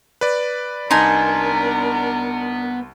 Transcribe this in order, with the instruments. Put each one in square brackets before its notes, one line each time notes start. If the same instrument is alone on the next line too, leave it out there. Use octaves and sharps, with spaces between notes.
[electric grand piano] B4 D5
[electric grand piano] C2 A5 C6 [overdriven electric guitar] B3 [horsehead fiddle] D4 A#4 [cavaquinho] D#4 G#5